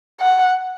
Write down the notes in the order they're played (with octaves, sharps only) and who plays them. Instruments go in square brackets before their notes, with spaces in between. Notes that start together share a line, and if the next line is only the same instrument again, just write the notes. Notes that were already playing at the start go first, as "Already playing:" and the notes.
[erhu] F#5